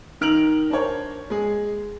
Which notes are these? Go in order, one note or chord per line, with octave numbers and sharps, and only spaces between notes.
D#3 D#4 F6 D7 F7 F#7
D4 A#4 C5 C#5
G#3 G#4